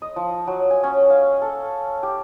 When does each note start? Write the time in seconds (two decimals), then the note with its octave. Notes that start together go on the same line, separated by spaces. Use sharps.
0.02 D#5
0.16 F3
0.47 F#3
0.71 G#5
0.83 C#4
1.10 F5
1.42 A4
2.03 G4